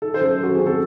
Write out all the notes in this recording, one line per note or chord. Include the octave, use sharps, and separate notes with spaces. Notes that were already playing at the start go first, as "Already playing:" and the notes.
D#4 A4
C5
F#2 A4
F#2 F#4
C4 G#4
A4